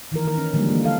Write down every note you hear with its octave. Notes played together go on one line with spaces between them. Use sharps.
D#3 E3 A#4
D#3 A#4
C#4
D3 F3 G3 G#3 A#3
E3 A#3
A4 F5